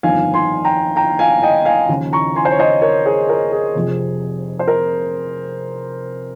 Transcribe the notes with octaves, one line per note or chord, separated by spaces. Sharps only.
G1 F2 D#3 F5 G#5
G#5 C6
G5 A#5
G5 A#5
F5 G#5
D#5 G5
F5 G#5
D#2 C#3 F3
A#5 C#6
G#5 C6
C5
C#5
C5 D#5
A#4 C#5
G#4 C5
A#4
G#4
F1 F2 C3
C5
A#4